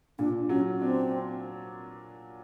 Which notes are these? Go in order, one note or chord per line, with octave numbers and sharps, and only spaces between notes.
A#2 D4
F#3 C#4
C4 D4